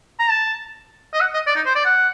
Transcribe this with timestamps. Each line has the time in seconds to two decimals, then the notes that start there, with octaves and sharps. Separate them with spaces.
0.19 A#5
0.30 A5
1.13 D#5
1.21 F#5
1.34 D#5
1.47 D5
1.56 D#4
1.66 C5
1.76 D5
1.85 F#5